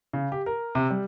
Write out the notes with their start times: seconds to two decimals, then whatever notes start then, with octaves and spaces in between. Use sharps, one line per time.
0.13 C#3
0.32 G4
0.46 A#4
0.75 C3
0.90 G3